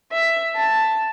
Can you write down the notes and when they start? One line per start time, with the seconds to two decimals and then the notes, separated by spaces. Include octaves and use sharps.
0.12 E5
0.55 A5